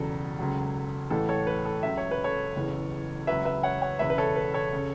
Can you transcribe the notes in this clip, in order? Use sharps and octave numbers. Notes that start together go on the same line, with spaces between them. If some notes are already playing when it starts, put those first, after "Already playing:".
Already playing: E1 E2 C#3 F#3 A4
C#2 C#3 F#3
A1 A2 E3 A4
A4 C#5
B4
A4
C#2 C#3 F#3 E5
C#5
B4
A4 C#5
F#1 E2 C#3 E3
C#2 C#3 F#3 B4 E5
B4 E5
C#5 F#5
C#5 F#5
E1 E2 C#3 B4 E5
B4
A4 C#5
B4
A4 C#5
C#3